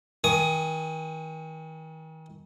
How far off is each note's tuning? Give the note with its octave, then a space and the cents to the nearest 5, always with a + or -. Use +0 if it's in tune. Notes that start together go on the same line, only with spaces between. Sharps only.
D#3 +40 G#5 +20 D#6 +0